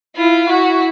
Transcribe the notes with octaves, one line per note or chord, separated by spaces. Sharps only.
E4 F4
E4 F#4